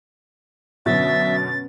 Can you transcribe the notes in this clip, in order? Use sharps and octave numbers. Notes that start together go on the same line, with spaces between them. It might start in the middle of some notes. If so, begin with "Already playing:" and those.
F#2 B2 D3 B3 C#4 E5 A6